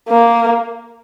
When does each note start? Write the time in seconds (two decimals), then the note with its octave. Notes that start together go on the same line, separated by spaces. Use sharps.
0.09 A#3